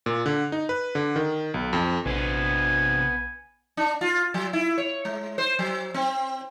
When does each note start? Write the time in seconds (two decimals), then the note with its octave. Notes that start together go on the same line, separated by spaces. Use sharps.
0.06 A#2
0.26 D3
0.52 D#4
0.69 B4
0.95 D3
1.16 D#3
1.54 B1
1.73 F2
2.06 A#1 C3 B3 D4 C5 G#5
3.77 D4
4.01 F4
4.34 F#3
4.53 E4
4.78 C#5
5.05 G#3
5.38 C5
5.59 F#3
5.94 C4